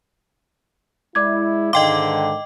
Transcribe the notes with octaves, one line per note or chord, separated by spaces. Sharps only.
G#3 E4 D5 D6 G#6
G#2 D3 D#3 D#5 F5 G5 C6 D6